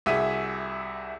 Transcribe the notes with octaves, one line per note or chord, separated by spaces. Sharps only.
C2 C3 F#4 G#4 E5 D#7